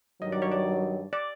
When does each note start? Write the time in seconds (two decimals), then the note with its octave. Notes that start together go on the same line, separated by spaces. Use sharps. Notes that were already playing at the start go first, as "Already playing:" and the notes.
0.22 G2 D#3 F#3 D#5
0.32 D5
0.42 C#5
0.52 D5
1.13 D5